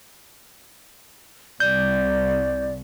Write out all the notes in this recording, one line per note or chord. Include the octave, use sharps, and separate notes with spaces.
C2 D5 G6